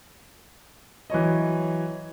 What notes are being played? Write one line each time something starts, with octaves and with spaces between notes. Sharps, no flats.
E3 F#3 C#5 D#5